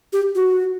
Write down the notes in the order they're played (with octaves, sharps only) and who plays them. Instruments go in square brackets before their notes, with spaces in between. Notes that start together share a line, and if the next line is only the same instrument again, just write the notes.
[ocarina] G4
F#4